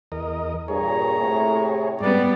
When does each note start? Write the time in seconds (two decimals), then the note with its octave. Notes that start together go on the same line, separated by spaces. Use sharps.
0.12 E2 A#4 D#5
0.68 G2 A#2 G#4 C#5 A#5
1.19 A2 C3
2.01 G#2 G3 B3 D5